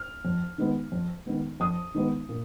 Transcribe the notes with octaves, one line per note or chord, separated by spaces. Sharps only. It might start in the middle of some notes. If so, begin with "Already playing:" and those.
Already playing: F6
F2
D#3 G#3 B3
F2
D#3 G#3 B3
F2 D#6
D#3 G#3 B3
A#2